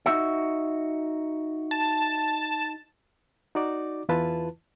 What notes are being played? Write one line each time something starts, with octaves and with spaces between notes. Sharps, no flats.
D#4 F#4 E5
A5
D#4 F#4 D5 D6
E2 E3 E4 F4 B4 A5